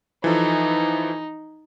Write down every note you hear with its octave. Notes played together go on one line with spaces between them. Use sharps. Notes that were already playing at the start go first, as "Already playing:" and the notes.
E3 F3 D#4 A4